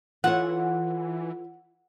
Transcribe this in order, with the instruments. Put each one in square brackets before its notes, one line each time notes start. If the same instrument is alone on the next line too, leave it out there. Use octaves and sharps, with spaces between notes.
[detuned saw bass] E3 [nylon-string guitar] F4 A4 C#5 [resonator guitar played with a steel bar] F#5